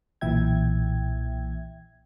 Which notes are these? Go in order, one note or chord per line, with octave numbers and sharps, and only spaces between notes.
B1 A#2 E3 E5 G5 G#6